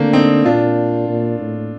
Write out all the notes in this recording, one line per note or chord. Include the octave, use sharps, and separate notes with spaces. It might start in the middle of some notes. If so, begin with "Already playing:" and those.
Already playing: D3 A3 A#3 C4 D4
C4 D#4
A#2 D4 F4
A#2
A2